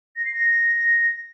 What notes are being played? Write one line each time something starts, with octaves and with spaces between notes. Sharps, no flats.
A#6
C7
A#6